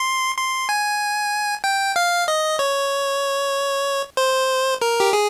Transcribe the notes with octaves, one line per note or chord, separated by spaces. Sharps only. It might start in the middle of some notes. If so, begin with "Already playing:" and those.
Already playing: C6
C6
G#5
G5
F5
D#5
C#5
C5
A#4
G4
G#4